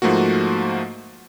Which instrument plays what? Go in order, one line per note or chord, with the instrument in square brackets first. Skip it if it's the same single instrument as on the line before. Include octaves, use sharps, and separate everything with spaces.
[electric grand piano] G#2 F3 A3 A#3 F#4